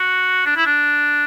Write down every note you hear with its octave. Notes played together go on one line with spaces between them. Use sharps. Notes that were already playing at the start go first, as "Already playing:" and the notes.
Already playing: F#4
D4
E4
D4